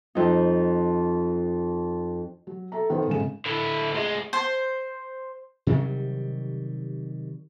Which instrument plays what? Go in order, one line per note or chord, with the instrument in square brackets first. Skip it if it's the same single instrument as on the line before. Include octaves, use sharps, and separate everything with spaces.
[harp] F2 D#4
[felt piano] F#3
A4 E5 A#5
D#3 B3 A4 C5
D#1 G#1 C#3 G#3 G#4 E7
[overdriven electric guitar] D3 E4
D2 G#3
[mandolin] C5
[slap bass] C3 D#3 F#3 G3